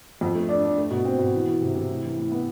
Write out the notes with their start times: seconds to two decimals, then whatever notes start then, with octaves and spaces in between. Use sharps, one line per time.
0.21 F2
0.35 A3
0.49 D4
0.64 D4
0.78 A3
0.91 B2
1.05 C4
1.19 B2
1.33 E3
1.47 E3
1.61 C3
1.75 C3
1.89 A2
2.04 E3
2.18 A2
2.32 B3